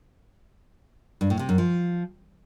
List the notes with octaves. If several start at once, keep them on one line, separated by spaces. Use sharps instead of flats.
G2
A2
C3
F#2
F3